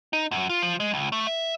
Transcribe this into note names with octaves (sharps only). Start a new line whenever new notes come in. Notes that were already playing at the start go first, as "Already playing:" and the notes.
D#4
F#2
F4
F3
G#3
C#2
A3
E5